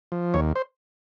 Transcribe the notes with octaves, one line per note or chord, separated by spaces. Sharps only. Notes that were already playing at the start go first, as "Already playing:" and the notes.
F3
D#2 C#5
C5